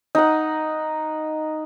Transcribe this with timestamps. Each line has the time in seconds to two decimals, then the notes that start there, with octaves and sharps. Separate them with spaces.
0.15 D#4 F#5